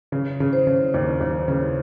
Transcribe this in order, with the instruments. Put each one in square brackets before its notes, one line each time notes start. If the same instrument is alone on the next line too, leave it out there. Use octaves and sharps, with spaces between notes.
[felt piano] C#3
C#3
[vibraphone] C5
[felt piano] C#3
D#2
D#2
C#3